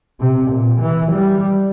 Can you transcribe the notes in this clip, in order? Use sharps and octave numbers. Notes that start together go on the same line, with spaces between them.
C3
A#2
E3
G3